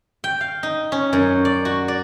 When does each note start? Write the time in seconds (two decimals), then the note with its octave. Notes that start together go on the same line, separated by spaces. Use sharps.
0.24 G5
0.41 F5
0.63 D#4
0.92 C#4
1.13 F#2
1.45 D5
1.65 F#4
1.88 D5